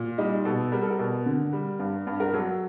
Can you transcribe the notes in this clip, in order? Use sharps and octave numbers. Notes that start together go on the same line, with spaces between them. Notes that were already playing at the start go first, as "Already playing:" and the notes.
Already playing: A#2
G3 D#4
B2 A4
G3 A#4
A4
A#4
B2
D3
G3
G2
G2
A#4
F#3 A4